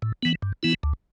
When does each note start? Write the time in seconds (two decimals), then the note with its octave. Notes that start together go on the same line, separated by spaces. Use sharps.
0.02 A2
0.23 E3 B3
0.42 G2
0.63 E3 B3 E4
0.83 D2